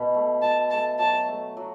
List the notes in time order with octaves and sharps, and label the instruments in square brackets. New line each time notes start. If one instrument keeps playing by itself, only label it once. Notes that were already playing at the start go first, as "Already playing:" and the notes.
Already playing: [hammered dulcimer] B2
A3
[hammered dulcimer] B2 [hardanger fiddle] A5
[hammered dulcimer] A3 [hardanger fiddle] A5
[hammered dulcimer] F#3 [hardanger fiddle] A5
[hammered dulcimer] A3
F#3